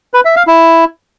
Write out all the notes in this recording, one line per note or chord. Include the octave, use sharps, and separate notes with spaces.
B4
E5
F5
E4